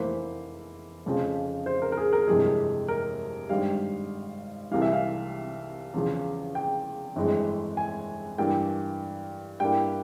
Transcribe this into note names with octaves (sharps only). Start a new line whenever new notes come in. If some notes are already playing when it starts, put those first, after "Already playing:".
Already playing: F1 E2 E3 A#3 E4 C5
F1 F2 C#3 F3
C5
A#4
A#4
G#4
A#4
G1 F2 C3 E3 G#3 G#4
A#4
G#1 G2 G3 F5
C2 C3 E3 F5
E5
F5
E2 C#3 F3
G5
G1 F2 E3 G#3 E4
G#5
G2 E3 A#3 G5
G2 G3 A#3 E4 G5